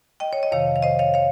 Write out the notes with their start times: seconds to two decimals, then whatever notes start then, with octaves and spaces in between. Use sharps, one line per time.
0.20 D#5 G5
0.33 C#5
0.43 D#5
0.51 F2 C3 D#3 C#5 F5
0.76 F5
0.82 C5 D#5
0.99 C#5 F5
1.14 D#3 C#5 F5